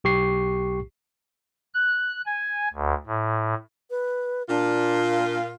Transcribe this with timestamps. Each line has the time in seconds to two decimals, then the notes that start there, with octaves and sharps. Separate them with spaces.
0.04 B1 G4 C#6 C7
1.74 F#6
2.26 G#5
2.74 D2
3.06 A2
3.90 B4
4.49 A#2 D4 F4